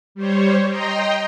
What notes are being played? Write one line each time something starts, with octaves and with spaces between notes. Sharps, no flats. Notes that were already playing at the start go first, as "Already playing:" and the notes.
G3 C5 C#5
D#5 G5 A#5 C6